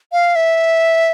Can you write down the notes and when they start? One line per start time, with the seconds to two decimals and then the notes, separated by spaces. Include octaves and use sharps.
0.12 F5
0.35 E5